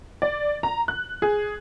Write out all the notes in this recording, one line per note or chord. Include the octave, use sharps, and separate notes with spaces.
D5
A#5
F#6
G#4